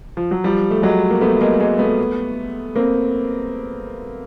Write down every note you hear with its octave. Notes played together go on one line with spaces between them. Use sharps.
F3
F#3
F3 G3
A3
F#3 G#3
A#3
A3 B3
G#3 A#3
G#3 A#3
A3 B3
A#3 C4